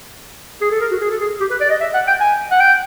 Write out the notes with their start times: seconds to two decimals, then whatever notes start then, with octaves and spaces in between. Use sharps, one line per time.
0.61 G#4
0.71 A4
0.81 A#4
0.91 F#4
1.01 G#4
1.10 A4
1.21 G#4
1.40 G4
1.51 B4
1.61 D5
1.70 D#5
1.81 E5
1.94 F#5
2.07 G5
2.20 G#5
2.51 F#5
2.60 G5